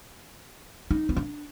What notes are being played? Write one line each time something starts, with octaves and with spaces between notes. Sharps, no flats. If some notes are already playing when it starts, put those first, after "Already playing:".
D#4
B3
D4